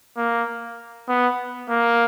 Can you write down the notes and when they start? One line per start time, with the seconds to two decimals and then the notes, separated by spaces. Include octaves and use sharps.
0.17 A#3
1.09 B3
1.69 A#3